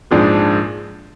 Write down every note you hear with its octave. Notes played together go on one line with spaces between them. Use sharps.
A#1 G#2 F3 G#3 D4